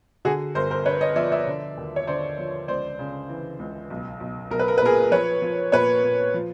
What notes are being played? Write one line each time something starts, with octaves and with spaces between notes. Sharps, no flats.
D3 F#4 G#4
G1 A#4 C5
A#4 C5
D3 B4 C#5
C#5 D#5
F3 D5 E5
D5 E5
D3
D#2
C#5
D3 C5 D5
F3
C#2 C5 D5
C#3
E3
C#2
B1
B1
B1 A#4
B4
A#4
B4
A#2 G#4 A#4
F3 B4 C#5
F3
A#2 B4 C#5
A#2
F3